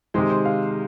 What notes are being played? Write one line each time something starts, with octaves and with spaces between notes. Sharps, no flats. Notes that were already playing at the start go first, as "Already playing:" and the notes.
C3 D#3 G#3 C5
C5
F5